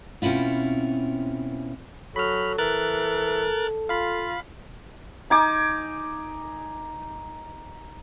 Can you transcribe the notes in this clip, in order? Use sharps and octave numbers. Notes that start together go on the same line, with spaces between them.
B2 C4 C#4 E4 F4
F#3 A4 B5 F6
E3 A#4 F#6 A6
F4 F5 B5
D#4 G#5 D6